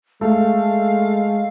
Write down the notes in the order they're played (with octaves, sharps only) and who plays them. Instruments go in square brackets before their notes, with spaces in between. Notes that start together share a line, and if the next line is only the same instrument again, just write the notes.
[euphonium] G#3 [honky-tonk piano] A3 [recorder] F5